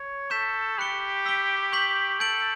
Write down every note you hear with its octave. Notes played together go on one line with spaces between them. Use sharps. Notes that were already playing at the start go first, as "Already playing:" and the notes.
Already playing: C#5
A4 C#6 G6 B6 E7
G4 B5 F#6 C#7 G7
E6 B6 D7 G7
C#6 G6 B6 F#7
A4 G6 D7 F#7